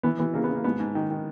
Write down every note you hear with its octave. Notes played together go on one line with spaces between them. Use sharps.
E3 B3
E3 B3
C#3 A#3
B3
C#3
A#3
G#2 B3
G#2
D#3
D#3